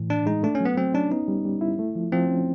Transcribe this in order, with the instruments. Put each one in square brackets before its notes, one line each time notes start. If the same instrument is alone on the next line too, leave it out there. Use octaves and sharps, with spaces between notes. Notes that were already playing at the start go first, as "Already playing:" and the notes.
Already playing: [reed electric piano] A2 E3
[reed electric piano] A2 [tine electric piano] D4
[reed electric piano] G#3 [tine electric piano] D#4
[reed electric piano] A3 [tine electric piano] D4
[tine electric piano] C#4
[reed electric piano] F#3 [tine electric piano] B3
[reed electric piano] F#3 [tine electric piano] C4
[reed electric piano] C#4 [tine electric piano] D4
[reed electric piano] B3 [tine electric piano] D#4
[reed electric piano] G3
G3
E4
A3
F3
[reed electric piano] F3 [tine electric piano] C4
[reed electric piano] C#4